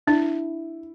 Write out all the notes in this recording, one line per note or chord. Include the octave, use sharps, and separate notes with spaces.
D4 E4